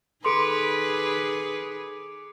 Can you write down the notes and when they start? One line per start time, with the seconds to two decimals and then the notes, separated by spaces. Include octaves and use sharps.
0.25 D#3 G#4 A4 B4 C6 D6 C#7 D7